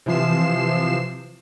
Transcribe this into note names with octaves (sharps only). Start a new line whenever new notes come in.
C3 E3 F3 C7 E7